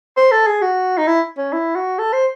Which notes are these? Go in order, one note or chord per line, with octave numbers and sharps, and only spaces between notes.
C5
A4
G#4
F#4
D#4
E4
C#4
E4
F#4
A4
C5